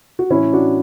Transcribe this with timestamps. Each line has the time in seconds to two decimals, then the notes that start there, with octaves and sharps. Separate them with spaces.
0.19 F#4
0.30 A2 E3 C#4 E4
0.53 D4 F#4